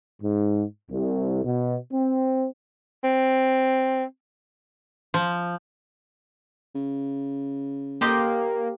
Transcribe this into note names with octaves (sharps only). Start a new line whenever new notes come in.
G#2
C2
B2
C4
C4
F3
C#3
A#3 G4 C5 D#5